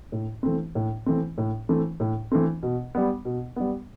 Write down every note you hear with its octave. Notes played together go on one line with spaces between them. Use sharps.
A2
E3 A3 C4
A2
E3 A3 C4
A2
E3 A3 C4
A2
E3 A3 C4
B2
G3 B3
B2
G3 B3